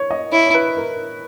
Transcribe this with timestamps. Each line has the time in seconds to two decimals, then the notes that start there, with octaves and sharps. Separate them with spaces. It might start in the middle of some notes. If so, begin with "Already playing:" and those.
Already playing: C#5
0.11 D#5
0.32 E4 C#5
0.47 C#5
0.54 B4
0.77 A#4